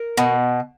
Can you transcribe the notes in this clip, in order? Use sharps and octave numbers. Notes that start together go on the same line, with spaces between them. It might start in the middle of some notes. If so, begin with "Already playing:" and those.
Already playing: A#4
B2